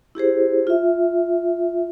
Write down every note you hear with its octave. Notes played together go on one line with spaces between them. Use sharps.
E4 G4 G#4 C5
F4 E5